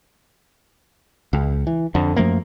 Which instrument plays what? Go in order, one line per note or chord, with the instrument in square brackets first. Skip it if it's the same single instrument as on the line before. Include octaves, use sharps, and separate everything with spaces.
[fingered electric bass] C#2
E3
F2 D3
F#2 F3 A3 A#3